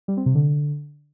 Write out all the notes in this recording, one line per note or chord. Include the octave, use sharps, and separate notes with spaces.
G3
C4
C3
D3